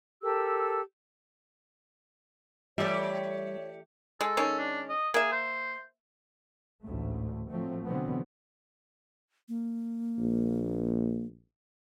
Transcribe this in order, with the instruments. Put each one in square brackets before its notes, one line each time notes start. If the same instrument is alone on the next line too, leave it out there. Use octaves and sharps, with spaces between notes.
[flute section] G4 A4 A#4 E6
[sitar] E3 A3 G4 [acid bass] G3 [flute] C#5 [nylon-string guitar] D5 E5
[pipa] G#3 [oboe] A4
[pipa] D#3 G#3 C#4
[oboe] D4
D#5
[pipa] A#3 E5 [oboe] G#4
[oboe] C5
[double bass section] A1 D2 G#2 A3
F3 F#3 A3 C4
B2 D3 E3 F#3 B3 C4
[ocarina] A#3
[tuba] A#1